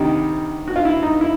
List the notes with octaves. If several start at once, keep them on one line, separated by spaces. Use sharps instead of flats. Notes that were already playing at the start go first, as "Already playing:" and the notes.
Already playing: D2 C3 D#3 G3 D#4
F#4
F4
E4
D#4
E4